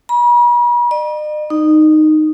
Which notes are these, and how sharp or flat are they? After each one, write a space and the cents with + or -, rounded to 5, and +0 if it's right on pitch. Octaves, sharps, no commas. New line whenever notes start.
B5 -45
D#5 -45
D#4 -10